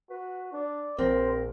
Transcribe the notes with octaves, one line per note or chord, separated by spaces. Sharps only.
F#4 B4
D4 D5
A#1 C4 A#4 C5